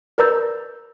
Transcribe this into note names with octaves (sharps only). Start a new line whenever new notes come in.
A#4 B4 D5 A#5 E6 G6